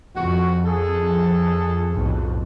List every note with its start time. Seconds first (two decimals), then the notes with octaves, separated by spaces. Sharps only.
0.15 F2 F#4
0.64 G#4 A4
1.95 B1 F2 A2